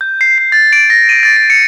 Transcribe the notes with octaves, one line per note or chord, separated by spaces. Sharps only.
G6
C7
C7
A6
D7
A#6
D#7
A6
D7
C#7